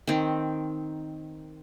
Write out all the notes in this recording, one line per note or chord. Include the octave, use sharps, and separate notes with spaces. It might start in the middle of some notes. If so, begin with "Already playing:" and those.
D#3 C4